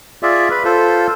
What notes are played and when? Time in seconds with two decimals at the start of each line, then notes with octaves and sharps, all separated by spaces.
0.23 F4 G#4 D5 E5
0.51 B4 B5
0.65 F4 A4 C5